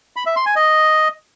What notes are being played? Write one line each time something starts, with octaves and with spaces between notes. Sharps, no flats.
B5
E5
C6
G#5
D#5